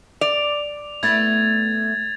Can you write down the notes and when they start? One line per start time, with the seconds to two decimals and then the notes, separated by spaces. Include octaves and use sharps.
0.21 D5 F7
1.03 A3 B3 E4 G#6 A6